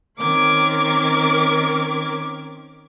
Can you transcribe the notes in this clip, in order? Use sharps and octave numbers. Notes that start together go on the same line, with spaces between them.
D#3 C4 C#4 A#4 D6 G#6